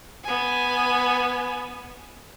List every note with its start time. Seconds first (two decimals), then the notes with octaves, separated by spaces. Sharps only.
0.24 B3 G#5